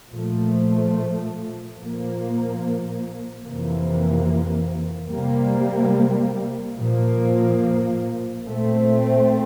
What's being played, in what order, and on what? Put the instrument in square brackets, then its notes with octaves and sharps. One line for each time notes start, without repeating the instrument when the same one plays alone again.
[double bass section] A#2 F3 A3
A#2 F3 A#3
F2 C3 E3 A#3
C3 G3 A#3
A#2 F3 A#3
A#2 A3 C4